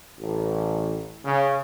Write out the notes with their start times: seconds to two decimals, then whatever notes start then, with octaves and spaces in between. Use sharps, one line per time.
0.18 A1
1.24 C#3